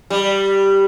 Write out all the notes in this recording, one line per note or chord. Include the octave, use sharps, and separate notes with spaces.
G3